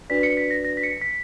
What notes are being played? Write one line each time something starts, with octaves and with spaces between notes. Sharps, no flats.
D4 F#4 B4 D5 B6
C#7
B6
A#6
A#6
B6
C#7
B6